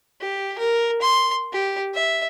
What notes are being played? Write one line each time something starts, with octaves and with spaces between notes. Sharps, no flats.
G4
A#4
C6
G4
E5